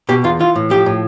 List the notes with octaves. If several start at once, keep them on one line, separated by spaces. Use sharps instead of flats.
B2 G4
E2 F4
E3 F4
A2
F3 G4
A2